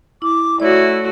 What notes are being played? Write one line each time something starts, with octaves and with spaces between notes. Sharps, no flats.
E4 D6
A3 E4 F#4 C#5 D5